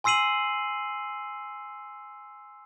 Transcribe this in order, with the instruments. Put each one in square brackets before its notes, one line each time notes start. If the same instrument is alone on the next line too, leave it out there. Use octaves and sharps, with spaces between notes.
[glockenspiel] G#5 C6 E6 C7 D#7 F#7